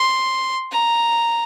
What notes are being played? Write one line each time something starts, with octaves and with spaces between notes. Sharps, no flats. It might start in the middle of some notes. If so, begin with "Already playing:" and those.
Already playing: C6
A#5